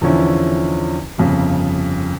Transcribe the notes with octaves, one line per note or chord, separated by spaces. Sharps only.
E2 D3 F3 C#4 E4
G1 F2 C#3